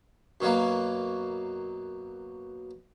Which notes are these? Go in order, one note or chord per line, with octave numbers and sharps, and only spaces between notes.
F#2 B2 F#3 A#3